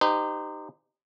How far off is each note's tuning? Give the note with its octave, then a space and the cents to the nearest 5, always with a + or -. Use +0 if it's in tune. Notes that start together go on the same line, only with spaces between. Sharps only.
D#4 -20 G4 +0 C5 -35